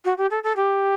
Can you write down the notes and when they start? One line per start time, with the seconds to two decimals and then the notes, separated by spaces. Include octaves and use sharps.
0.05 F#4
0.18 G4
0.31 A4
0.44 A4
0.56 G4